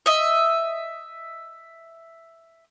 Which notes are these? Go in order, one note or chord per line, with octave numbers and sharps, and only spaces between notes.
D#5 E5